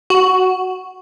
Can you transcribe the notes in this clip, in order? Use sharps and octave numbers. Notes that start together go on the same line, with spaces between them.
F#4